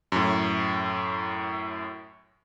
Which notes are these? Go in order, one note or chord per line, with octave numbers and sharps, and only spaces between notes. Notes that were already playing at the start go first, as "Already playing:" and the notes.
F#2 A2